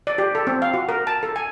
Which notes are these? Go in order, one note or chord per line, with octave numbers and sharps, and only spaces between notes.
D5
G4
A4
C4
F5
F#4
A#4
A5
A4
G#5